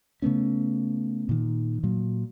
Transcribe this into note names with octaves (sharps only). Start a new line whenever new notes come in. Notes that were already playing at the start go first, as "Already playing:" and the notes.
C#3 A3 B3 C#4
A#2 D#3
A#2 F#3